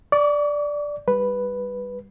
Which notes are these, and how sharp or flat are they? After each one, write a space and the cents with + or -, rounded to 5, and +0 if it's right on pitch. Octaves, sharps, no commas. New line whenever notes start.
D5 +0 C#6 +45
G3 +10 B4 +0